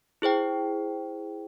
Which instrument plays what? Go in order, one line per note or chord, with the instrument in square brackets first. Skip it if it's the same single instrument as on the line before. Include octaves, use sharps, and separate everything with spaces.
[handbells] E4 G#4 C5 G5